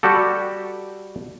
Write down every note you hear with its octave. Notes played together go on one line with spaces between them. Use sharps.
G3 F#4 G4 A4